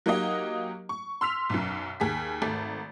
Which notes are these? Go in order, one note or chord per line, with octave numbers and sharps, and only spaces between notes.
F#3 A#3 D#4 G4 D#5
C#6
C6 E6 F6 B6 F7
B1 F#2
D#2 G#4 B6
G#1 A3